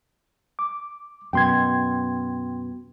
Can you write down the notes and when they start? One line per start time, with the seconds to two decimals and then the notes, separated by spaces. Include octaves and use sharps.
0.59 D6
1.33 F#2 B2 G5 C6 G#6